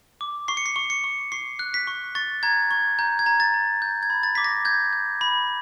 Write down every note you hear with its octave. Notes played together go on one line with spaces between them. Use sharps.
D6
C#6 C7
C#7
C7
C#6
C#7
C#6
C#6 C7
F#6
B6
C#6
C#6 A6
A#5 G#6
C#6 G#6
A#5 G6
G#6
A#5
A6
A#5
G6
G#6
B5
A6
D6 B6
A#6
G6 G#6
G6
B5